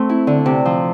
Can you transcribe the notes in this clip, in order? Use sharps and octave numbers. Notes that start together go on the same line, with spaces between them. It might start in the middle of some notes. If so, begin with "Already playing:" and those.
Already playing: A3 C4
E4
D3
C3
F3